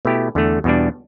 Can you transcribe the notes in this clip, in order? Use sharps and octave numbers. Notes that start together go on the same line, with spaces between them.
B2 A3 E4 G4
E2 D3 A3
E2 B2 G3 D4